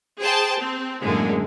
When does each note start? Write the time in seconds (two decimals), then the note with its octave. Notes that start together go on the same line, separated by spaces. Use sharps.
0.20 G#4 C5 G5 A5
0.59 C4
1.02 F#2 A2 D3 G#3 A#3